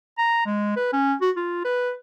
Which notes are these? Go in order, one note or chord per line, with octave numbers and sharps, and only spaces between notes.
A#5
G#3
B4
C#4
F#4
F4
B4